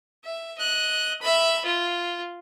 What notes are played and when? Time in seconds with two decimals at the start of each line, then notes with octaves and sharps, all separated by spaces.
0.24 E5
0.58 D#5 F#6
1.21 E5 B5
1.65 F4